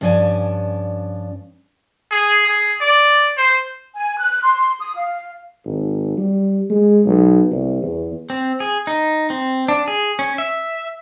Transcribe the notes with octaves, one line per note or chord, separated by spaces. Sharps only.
G2 F3 C#4 D4 F#4 G#5
G#4
G#4
D5
C5
G#5
F#6
C6
D#6
F5
G#1
G3
G#3
B1
C2
E2
C4
G#4
D#4
C4
D4
G#4
C#4
E5